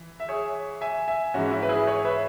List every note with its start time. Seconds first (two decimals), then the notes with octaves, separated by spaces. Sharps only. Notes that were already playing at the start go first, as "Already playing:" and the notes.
Already playing: E3
0.20 E5
0.28 G#4 C#5
0.81 E5 G#5
1.08 E5 G#5
1.34 G#2 E3 C#4 F#4
1.51 E4
1.63 B4
1.69 E4 G#4
1.87 G#4 C#5
2.04 B4 E5